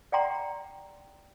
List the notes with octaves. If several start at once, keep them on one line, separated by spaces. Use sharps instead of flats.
D5 F#5 G5 A#5 C6